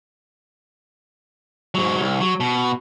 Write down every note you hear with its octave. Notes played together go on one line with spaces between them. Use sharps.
G#2 F#3
C2
F#3
B2